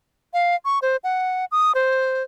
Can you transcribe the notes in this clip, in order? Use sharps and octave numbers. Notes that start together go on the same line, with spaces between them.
F5
C#6
C5
F#5
D#6
C5